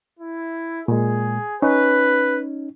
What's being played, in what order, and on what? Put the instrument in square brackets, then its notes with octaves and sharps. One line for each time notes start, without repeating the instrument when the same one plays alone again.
[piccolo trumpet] E4
[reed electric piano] A#2 G#3 [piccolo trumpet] G#4
[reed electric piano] C#4 D#4 [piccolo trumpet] B4